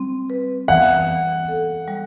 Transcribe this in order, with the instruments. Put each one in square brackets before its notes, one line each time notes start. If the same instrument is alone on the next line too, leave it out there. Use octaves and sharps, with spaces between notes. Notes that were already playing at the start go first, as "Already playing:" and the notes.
Already playing: [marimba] G3 C4
B4
[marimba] E3 [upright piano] F#5
[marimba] E3
A4
G3